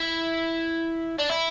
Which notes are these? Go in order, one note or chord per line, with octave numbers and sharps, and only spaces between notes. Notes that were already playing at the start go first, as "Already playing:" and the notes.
Already playing: E4
D4
E4